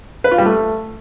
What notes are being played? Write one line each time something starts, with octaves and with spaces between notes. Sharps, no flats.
B4
F4
G3
A3